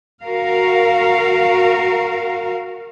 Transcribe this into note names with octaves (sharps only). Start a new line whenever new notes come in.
F#4 A#4 F5